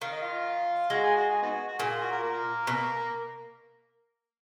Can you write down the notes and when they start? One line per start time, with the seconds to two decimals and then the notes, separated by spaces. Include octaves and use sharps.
0.02 D#3 F5
0.13 D#5
0.22 F4 F5
0.90 G#3 F#4
1.04 G#4
1.16 F#4
1.29 G#4
1.42 B3 D#4 F#4
1.68 F#4
1.79 A#2 G#3 G#4
1.90 F4
2.02 F#4
2.12 A#3 A#4
2.23 A#3 A#4
2.67 B2